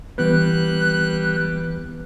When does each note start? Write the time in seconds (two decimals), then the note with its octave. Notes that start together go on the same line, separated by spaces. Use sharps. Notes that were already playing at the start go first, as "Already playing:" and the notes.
0.18 E3 G3 B3 B4 F#6